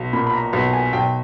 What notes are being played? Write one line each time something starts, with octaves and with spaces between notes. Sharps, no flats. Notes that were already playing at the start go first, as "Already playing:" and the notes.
Already playing: B1
A#2 B5
B5
A#5
B1 A5
G#5
B1 G5